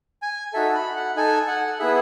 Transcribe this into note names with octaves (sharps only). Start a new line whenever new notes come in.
G#5
D#4 F#4 A4 E5
B5
F#5
D#4 A4 G#5
F#5
B3 E4 G#4 E5